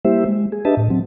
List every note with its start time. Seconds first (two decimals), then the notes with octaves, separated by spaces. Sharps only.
0.05 G3 A#3 E4 G4 C5 E5
0.26 G#3
0.52 G#4
0.65 D4 G4 B4 D#5 E5 A5
0.77 A2
0.90 F#3 C4